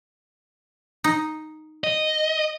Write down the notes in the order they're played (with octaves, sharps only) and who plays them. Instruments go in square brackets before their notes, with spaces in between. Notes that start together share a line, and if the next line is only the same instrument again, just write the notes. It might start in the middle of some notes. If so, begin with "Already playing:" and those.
[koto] D#4
[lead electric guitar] D#5